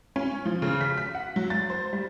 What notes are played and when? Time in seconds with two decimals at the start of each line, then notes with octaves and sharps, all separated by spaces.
0.16 C#4
0.45 F3
0.62 C#3
0.81 B6
0.97 B6
1.15 F#5
1.36 F#3
1.50 A6
1.70 C5
1.93 G3